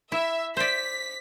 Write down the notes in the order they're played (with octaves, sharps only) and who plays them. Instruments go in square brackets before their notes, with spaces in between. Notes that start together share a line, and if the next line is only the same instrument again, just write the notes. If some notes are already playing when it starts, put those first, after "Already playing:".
[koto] E4 [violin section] E5
[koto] C5 D5 [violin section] B6